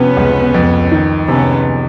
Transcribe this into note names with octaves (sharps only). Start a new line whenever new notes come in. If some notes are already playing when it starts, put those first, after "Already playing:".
Already playing: C3 F3 B3 C#4
C#2
F2
D#3
C3 B3 C#4